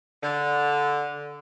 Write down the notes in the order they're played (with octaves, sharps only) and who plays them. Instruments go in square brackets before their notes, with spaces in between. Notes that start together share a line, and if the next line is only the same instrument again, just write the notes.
[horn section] D3